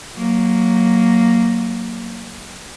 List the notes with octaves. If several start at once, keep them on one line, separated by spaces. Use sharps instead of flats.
F#3 A#3